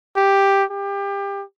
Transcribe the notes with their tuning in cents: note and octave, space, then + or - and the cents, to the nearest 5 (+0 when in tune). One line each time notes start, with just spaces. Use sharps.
G4 +5
G4 +25